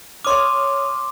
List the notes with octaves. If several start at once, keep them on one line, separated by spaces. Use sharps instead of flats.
C#5 C6 D6 D#6 F6